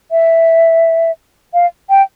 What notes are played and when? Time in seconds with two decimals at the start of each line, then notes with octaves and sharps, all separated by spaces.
0.11 E5
1.54 F5
1.90 G5